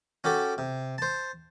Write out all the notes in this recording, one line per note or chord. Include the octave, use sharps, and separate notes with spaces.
C#4 F#4 G4 A4
C3
C5 A5